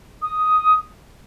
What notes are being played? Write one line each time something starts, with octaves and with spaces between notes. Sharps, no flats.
D#6